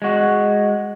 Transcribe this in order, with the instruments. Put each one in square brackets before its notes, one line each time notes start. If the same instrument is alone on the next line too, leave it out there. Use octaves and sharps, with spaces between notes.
[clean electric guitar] G#3 F#4